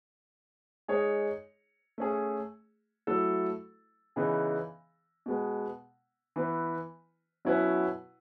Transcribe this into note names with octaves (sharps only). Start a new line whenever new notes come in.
G#3 D#4 G#4 C#5
A3 C#4 G#4
F#3 A3 E4 A4
C#3 E3 B3 D#4 G#4
B2 G#3 B3
E3 B3 E4 B4
B2 F#3 C#4 E4 B4